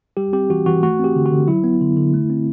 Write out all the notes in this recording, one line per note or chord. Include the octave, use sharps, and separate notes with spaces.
G3 G4
C4 G4
E3 F#4
E3 F#4
A3 F#4
C4
G4
D3
F#4
D3
F#3 E4
B3
D3
D3
A3
C4